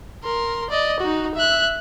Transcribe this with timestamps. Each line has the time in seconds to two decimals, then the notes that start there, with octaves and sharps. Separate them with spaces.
0.24 A#4 C6
0.70 D5 D#5
1.00 D#4 F#4
1.35 E5 F#6